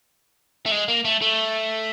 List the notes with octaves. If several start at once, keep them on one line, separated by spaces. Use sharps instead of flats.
A3
G#3
A#3
A3
A3